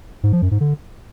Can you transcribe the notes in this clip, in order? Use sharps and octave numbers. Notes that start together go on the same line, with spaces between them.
G#2
F3
F#2
G#2
D3